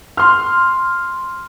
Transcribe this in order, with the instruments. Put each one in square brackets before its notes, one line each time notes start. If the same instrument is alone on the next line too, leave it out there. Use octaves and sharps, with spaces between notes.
[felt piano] C6 F6